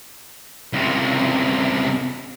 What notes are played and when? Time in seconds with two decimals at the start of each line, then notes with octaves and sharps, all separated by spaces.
0.73 C#2 C3